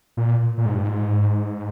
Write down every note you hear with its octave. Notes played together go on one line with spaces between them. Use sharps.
A#2
A#2
G#2
G2
G#2